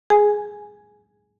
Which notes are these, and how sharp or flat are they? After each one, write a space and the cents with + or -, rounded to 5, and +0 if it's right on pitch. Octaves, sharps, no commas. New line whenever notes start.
G#4 +0 G#5 +5